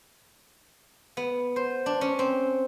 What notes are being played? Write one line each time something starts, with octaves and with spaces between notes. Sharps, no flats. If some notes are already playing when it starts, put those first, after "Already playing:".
B3
C5
D4
C#4
C4